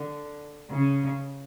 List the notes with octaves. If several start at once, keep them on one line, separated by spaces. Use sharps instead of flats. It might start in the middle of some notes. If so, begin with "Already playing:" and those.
Already playing: D3
C#3